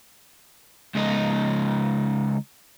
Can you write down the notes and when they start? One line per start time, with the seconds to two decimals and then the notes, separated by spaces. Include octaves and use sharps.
0.95 C#2 D#4